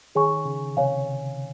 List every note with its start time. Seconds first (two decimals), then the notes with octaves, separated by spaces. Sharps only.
0.15 D#3 G#4 C#5 G#5 C#6
0.45 C#3
0.77 C3 C#5 F5 G#5